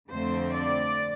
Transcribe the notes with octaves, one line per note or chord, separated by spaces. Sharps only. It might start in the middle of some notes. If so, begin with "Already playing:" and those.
F2 D3 A3 C4 C5
D5